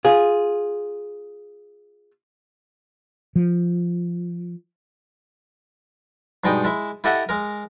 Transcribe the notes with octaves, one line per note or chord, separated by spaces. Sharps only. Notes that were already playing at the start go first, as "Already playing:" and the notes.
F4 G#4
F3
G2 B2 G#3 D#4 G5
G#3 E4 E5
E4 G4 A4 D#5 E5 F#5
G#3 A#4